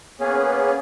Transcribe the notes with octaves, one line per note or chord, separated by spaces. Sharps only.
A#3 B3 C#4 G#4